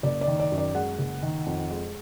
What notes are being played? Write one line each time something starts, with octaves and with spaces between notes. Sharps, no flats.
F#1 D5
D5
D#3
D5
F#2
D5
G#3 F#5
F#1
D#3
F2
G#3